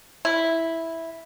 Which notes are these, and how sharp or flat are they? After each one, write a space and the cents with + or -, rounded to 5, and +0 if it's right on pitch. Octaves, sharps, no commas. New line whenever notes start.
E4 -5